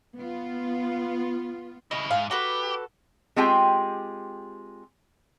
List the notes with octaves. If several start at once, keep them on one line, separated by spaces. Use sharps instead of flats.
B3 F4
C#3 E4 D#5
G#2 F5
F#4 G4 A4 B4
G#3 C4 F4 G4 G5 G#5